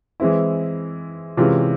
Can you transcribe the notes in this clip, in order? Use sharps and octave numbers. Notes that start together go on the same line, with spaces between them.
E3 G#3 C4 E4
C3 E3 G#3 C#4 F4